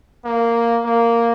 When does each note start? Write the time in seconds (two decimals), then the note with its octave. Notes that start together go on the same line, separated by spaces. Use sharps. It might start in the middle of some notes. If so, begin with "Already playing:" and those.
0.25 A#3
0.85 A#3